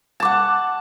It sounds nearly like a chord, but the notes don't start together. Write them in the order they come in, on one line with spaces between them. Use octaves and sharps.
A5 D6 F#5